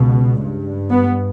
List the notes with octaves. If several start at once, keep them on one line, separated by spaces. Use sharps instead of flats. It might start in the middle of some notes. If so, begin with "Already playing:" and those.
Already playing: C#2 B2
G2
B3